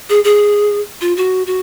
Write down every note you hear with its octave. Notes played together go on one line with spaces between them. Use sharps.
G#4
G#4
F4
F#4
F#4